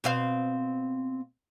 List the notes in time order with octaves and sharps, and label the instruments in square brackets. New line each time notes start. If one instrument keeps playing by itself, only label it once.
[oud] B2 C4 F5